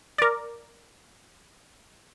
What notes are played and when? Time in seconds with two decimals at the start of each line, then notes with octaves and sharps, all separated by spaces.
0.18 A#4 D5 D6 A6